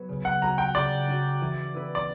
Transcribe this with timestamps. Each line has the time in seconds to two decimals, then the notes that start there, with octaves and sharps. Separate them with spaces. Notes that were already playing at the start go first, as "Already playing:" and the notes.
Already playing: F#3 B3 F#4 B4
0.09 C#3
0.25 F#5
0.42 G3 C#4 F#4 A#5
0.58 G5
0.74 C#3 D5
1.08 G3 C#4 F#4
1.41 E3
1.74 B3 E4 B4
1.95 D5